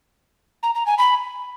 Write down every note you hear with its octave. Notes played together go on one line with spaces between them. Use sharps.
A#5
A#5
G#5
B5